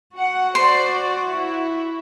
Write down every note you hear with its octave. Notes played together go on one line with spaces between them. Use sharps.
F#4 F#5
C5 D5 C6
E4